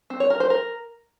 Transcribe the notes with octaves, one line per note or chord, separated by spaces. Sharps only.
C4
C#5
A#4
C5
A#4